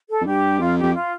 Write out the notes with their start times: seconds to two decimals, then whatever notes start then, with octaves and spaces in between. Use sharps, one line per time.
0.09 A4
0.21 F2
0.26 G2 G4
0.60 F2 F4
0.78 G4
0.83 F2
0.94 F4